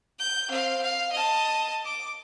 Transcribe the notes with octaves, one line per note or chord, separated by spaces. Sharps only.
G6
C4 F5
F5
D#5 A5
D6